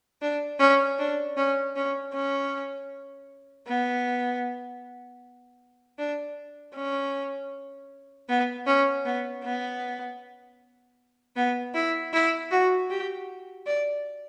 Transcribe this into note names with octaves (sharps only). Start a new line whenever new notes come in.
D4
C#4
D4
C#4
C#4
C#4
B3
D4
C#4
B3
C#4
B3
B3
B3
E4
E4
F#4
G4
D5